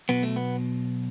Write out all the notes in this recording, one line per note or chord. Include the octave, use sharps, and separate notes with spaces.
B1 B2 B3
A3
B3